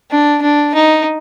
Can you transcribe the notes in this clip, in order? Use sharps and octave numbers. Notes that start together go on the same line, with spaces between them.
D4
D4
D#4